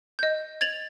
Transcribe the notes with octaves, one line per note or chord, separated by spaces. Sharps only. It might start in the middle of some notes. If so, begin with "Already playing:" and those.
D#5 G6
G#6 A6 F7 F#7